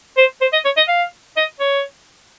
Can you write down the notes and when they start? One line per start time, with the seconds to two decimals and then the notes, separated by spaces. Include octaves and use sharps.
0.17 C5
0.41 C5
0.53 D#5
0.65 C#5
0.77 D#5
0.88 F5
1.37 D#5
1.60 C#5